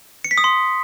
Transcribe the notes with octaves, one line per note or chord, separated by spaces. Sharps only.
C#7
B6
D#6
C6